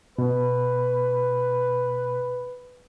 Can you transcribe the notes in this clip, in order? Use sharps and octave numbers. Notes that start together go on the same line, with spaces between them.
B2 B4